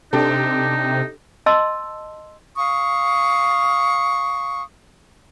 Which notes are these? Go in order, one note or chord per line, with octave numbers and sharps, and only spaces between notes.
C3 D4 D#4 G4 A4
D#5 A5 C6 E6
F5 C#6 D#6